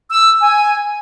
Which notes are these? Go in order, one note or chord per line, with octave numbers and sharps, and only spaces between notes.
E6
G#5